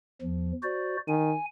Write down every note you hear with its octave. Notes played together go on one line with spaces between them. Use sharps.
E2 F3
F#4 C5 D5
D#3 G#5